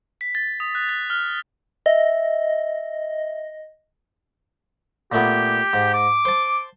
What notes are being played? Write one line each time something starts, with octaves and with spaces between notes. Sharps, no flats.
B6
A6
D#6
F#6
A6
F6
D#5 E5
A#2 A3 B3 G4
G#2
D6
C5 A5